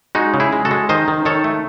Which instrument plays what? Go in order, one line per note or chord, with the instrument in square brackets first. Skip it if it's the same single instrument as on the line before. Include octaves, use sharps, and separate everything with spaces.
[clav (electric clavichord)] G#3 D#4 F#4
C#3
E4 G#4
G#3
F#4 A4
G#3
D#3 C5 D#5
D#3
D#3 A4 C#5
A3